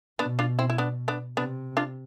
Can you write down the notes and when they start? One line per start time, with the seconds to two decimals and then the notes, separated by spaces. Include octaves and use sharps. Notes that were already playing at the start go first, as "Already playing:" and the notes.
0.19 B2 B3 D4
0.39 D4 F4
0.59 C4 E4
0.70 E4
0.78 B3 D4
1.08 B3 D4
1.37 C3 B3 D4
1.77 D4 F4